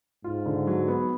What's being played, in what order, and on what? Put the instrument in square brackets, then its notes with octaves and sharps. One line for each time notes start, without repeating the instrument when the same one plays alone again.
[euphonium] G#2 [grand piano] F4
[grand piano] D3
F#3
B3